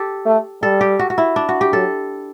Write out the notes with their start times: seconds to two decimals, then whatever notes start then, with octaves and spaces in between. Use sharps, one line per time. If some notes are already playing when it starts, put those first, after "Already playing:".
Already playing: G4 A4
0.26 A3
0.62 G3 A4
0.81 G4
0.99 F#4
1.10 F#4
1.18 E4
1.36 D4
1.49 F#4
1.61 G4
1.72 F#3 A4